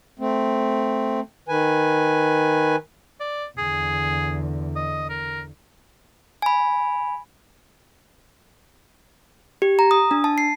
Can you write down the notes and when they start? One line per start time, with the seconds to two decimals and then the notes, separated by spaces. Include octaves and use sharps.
0.20 A3 C4
1.48 D#3 B4 G#5
3.20 D5
3.58 E2 D3 G#4
4.76 D#5
5.09 A#4
6.42 G#5 B5
9.62 G4
9.79 A#5
9.91 D#6
10.11 D4
10.24 A5
10.38 C7